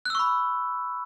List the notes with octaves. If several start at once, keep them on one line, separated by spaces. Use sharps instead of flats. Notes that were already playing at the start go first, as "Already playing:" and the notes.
B5 C#6 E6 F#6